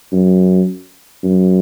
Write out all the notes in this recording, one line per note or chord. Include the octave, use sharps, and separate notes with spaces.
F#2
F#2